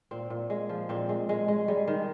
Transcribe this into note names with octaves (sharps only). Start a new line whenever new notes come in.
A#2 C4
A#2
G#3
F3
A#2 C4
G#3
G#3
G#3
G3 G#3
D#3